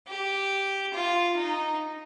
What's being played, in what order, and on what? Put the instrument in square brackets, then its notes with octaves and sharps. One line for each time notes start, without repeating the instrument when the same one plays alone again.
[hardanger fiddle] G4
F4
D#4